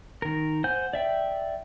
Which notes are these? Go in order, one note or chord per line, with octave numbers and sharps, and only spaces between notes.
D#3 A#4
C5 F#5 G#5 G6
D5 E5 G5